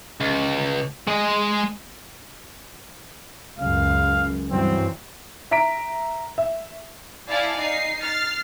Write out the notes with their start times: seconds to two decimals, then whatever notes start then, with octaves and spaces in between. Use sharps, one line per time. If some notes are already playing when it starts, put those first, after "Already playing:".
0.20 C#2
1.07 G#3 D#5
3.59 C#2 F#2 C#3 F5
4.50 G2 E3 F#3 C4
5.51 E5 A#5 B6 D7
6.38 E5
7.29 E4 D5 F5 G#5 A5
7.59 D#4 C7
8.01 F6 A6 C7